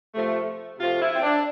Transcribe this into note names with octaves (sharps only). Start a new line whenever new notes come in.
C3 F3 A3
C3 F3 A3 F4
E4
C4
D4